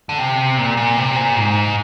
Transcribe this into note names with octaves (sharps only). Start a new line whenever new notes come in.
D3
C3
A#2
A#2
C3
A#2
G#2